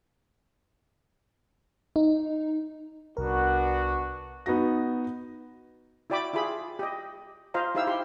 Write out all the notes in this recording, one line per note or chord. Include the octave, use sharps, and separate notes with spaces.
D#4
C2 B3 D4 F#4 A#4
B3 D#4 F#4 A#6
E4 F#4 D5 G5 B5 D6
E4 F4 G4 G#4 B5
G4 D#5
F4 C5 D#5 F5 A#5
D#4 E4 G4 C5 F5 E6
E4 G4 F5 C6